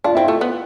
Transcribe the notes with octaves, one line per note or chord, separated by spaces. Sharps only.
D4 F4
C4 E4
A3 F4
B3